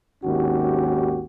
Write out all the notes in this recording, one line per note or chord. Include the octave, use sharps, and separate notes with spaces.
G#1 D#2 C#4 F#4 G4